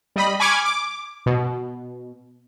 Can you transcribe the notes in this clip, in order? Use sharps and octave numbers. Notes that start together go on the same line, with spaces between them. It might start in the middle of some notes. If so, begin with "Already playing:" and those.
G3 D#5 B5
G#5 B5 C#6 D6 F6 G#6
D6
B2